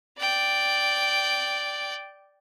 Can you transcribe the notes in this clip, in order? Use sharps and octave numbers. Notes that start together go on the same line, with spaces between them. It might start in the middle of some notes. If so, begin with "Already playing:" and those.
D5 G5